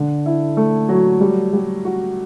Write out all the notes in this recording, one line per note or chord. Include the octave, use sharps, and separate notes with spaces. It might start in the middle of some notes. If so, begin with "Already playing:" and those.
Already playing: D3
E4
A3
F#3
G3
G3
F#4